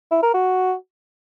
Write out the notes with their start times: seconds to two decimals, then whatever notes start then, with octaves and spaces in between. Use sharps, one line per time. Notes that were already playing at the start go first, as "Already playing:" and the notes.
0.12 E4
0.23 A#4
0.34 F#4